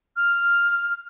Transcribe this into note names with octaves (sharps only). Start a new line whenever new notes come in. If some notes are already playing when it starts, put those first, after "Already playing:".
F6